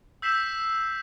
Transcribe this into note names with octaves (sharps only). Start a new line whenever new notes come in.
E6 G6 B6 C7 E7 F#7